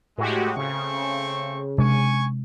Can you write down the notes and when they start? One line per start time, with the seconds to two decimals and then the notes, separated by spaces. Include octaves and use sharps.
0.18 A2 G#3 F#4 G4
0.57 C#3 A3 C4 C#6
1.78 C3 G#3 D4 G#5 C#6